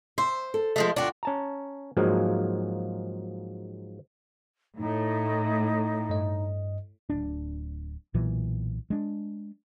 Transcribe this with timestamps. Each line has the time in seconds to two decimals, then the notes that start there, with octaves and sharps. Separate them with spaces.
0.18 C5 E5
0.54 A4
0.76 F3 G#3 A3
0.96 D#2 D4 F4 F#4
1.23 C#4 A5 A#5
1.97 G#2 F3 F#3 G#3 A#3
4.78 A2 D#4
6.10 G2 D#5
7.10 D1 D4
8.14 B1 A#2 E3
8.90 G#3 D4